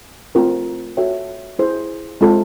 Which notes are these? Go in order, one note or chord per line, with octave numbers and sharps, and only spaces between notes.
A3 C4 F4 A#4
F#4 A4 C#5 E5 G5
E4 G#4 C5
G#3 C4 F4 A4